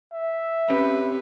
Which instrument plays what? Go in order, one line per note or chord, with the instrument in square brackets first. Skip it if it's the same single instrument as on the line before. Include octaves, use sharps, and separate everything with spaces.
[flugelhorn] E5
[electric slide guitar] C4 G4 C#5 [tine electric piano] C#4 [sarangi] B4